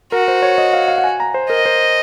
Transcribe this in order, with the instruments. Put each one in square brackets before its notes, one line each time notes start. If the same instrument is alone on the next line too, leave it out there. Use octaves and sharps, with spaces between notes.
[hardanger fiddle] F#4 [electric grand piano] A#4
[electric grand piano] C5
C#5
D#5
F5
F5
F#5
G#5
A#5
C5
[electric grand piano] A#4 [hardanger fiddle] D#5
[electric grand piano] C5